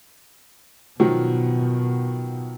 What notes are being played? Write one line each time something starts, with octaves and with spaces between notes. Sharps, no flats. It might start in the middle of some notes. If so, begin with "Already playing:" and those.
B2 D#3 F3 F#3